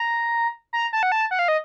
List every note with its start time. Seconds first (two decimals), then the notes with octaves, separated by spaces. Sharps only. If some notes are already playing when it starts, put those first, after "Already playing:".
Already playing: A#5
0.73 A#5
0.93 A5
1.03 F#5
1.12 A5
1.31 F#5
1.39 F5
1.48 D#5